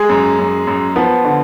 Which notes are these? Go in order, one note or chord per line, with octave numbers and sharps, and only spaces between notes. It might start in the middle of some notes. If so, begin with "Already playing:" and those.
Already playing: G#3 G#4
F#2
F#2
F#2
F3 B3
D3